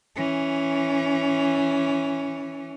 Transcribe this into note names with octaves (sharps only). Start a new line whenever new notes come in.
E3 C#4